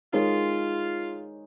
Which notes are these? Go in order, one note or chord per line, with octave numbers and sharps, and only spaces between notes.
G#3 D#4 F4 A#4 C#5